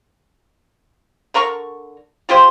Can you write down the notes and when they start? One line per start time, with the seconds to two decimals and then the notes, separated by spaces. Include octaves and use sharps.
1.34 D3 A#4 A#5 C#6
2.29 F4 G4 G#4 C5